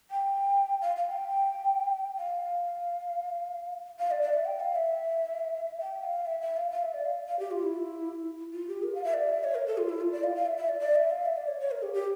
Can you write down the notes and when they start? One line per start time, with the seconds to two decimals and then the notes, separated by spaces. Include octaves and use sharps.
0.11 G5
0.82 F5
0.96 F5
1.11 G5
2.18 F5
3.99 F5
4.11 D5
4.22 D5
4.34 E5
4.45 G5
4.60 F5
4.75 E5
5.81 G5
6.04 F5
6.26 E5
6.41 E5
6.57 F5
6.72 F5
6.82 E5
6.94 D5
7.05 F5
7.28 F5
7.39 G4
7.51 F4
7.63 E4
8.53 F4
8.68 G4
8.83 A#4
8.95 F5
9.04 E5
9.14 D5
9.29 E5
9.44 C#5
9.55 A#4
9.67 A4
9.78 F4
9.89 E4
10.01 F4
10.12 D5
10.24 F5
10.35 F5
10.46 E5
10.57 E5
10.69 D5
10.80 D5
10.96 E5
11.10 F5
11.25 E5
11.37 D5
11.48 C#5
11.60 C#5
11.71 A#4
11.83 G4
11.94 G4